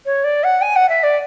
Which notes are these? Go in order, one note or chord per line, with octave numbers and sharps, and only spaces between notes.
C#5
D5
F#5
G#5
F#5
E5
D5